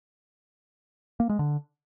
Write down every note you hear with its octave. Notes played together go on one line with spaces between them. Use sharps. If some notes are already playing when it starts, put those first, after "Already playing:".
A#3
G#3
D3